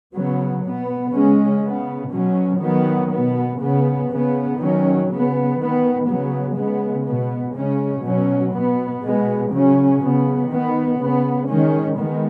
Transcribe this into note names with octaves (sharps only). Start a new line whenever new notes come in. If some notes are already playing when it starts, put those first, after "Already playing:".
C#3 F#3 B3
B2 B3
C#3 G#3 C#4
C#3 B3
B2 F#3 C#4
D#3 F#3 B3
B2 B3
C#3 B3
C#3 B3
D#3 F#3 C#4
C#3 B3
D#3 B3
C#3 F#3 B3
C#3 G#3 B3
B2 B3
C#3 G#3 C#4
B2 F#3 C#4
B2 B3
B2 G#3 B3
C#3 F#3 C#4
C#3 B3
D#3 B3
C#3 B3
D#3 G#3 C#4
D#3 G#3 B3